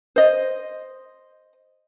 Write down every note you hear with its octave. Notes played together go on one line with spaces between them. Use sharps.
C5 D#5